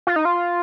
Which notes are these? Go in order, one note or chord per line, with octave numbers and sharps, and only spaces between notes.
F4
D#4
F4